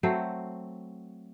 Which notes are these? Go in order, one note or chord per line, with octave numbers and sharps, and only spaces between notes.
F#3 A3 C4 C5